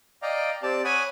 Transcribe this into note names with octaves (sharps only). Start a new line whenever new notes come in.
D5 D#5 F5 G5 A#5
C4 G4 D5 A5
C#5 F#5 G#5 B5 D#6